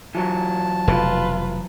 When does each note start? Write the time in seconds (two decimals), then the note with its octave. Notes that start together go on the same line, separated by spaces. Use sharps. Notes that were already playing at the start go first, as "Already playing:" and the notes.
0.15 E3 F#3 A5
0.88 F1 B2 F4 B4